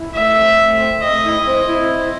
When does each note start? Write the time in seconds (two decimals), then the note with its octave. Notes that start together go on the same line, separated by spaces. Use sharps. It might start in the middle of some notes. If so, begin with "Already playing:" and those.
Already playing: E4
0.14 A3 E5
0.36 C4
0.58 A3
0.80 C4
1.02 A3 D#5
1.24 E4
1.46 C4
1.68 E4
1.90 C4